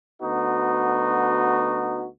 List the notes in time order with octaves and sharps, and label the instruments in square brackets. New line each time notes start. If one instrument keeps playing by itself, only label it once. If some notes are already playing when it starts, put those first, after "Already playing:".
[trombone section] D2 B3 D#4 F#4